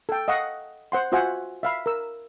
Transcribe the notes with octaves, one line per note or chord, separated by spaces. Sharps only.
A4 G5
D#5 F5 F#5 C#6
C5 F#5 C6
F4 F#4 C5 E5 F#5 G#5
E5 F5 B5
A#4 E6